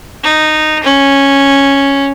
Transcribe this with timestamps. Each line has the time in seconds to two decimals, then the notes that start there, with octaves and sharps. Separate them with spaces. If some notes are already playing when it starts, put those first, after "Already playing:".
0.24 D#4
0.84 C#4